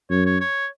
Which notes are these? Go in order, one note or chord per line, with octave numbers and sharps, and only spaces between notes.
F#2 C#5
C#5
C#5